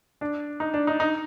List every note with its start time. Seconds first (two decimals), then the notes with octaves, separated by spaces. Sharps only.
0.21 D4
0.60 D#4
0.74 D4
0.87 D#4
1.00 D#4